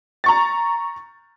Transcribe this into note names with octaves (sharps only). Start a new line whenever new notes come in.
A#5 C#6 A6